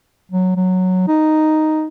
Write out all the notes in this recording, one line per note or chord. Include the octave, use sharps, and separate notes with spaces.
F#3
F#3
D#4